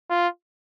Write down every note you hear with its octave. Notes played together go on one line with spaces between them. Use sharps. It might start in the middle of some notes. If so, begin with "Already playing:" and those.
F4